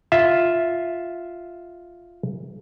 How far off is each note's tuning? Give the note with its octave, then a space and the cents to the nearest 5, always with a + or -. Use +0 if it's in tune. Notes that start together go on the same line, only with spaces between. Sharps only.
F4 +0 E5 +0